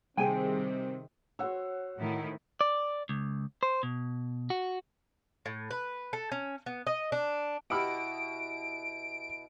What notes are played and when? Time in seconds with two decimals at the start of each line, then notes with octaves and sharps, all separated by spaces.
0.17 C3 D#3 G3 C4 G#4 G5 G#5
1.39 F#4 C5 C#5 F#5 E6
1.99 A2 D#3 E4
2.61 D5
3.09 C#2
3.63 C5
3.83 B2
4.50 F#4
5.46 A2
5.71 B4
6.13 A4
6.32 C#4
6.66 B3
6.87 D#5
7.12 D4
7.70 B2 E4 G4 F#5 B5 E6 F6 D7